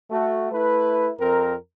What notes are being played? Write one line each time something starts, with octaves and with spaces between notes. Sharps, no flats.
A3 F#4
A3 E4 B4
F2 C4 A#4